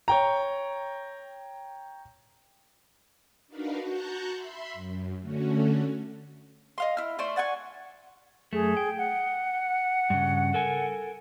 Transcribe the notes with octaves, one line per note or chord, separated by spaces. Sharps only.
C#5 G5 A#5
D4 D#4 F#4 A#4 B4 F5
F#4 A5 A#5 C#6 F#6 G6
E5 B5 C6
F#2
D3 A3 C#4 F#4
D#5 F5 C6
E4 F6
A3 C5 D5
D5 F#5 G#5 C#6
F#2 A3 G#4
G5
F#5
G2 C#3
A4 A#4 G#5